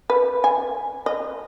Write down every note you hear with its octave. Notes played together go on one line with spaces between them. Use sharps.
B4
G#5
D#5